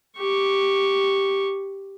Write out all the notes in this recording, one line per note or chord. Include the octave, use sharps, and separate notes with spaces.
G4 C#6